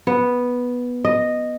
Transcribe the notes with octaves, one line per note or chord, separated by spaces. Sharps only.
B3
D#5